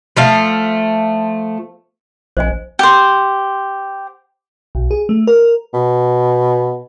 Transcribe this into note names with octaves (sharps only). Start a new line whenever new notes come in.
F3 A3 F5
A#1 C5 D#5 G#5
G4 C5
B1
G#4
A3
A#4
B2